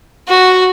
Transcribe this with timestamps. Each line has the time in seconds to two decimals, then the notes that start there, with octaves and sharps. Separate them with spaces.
0.29 F#4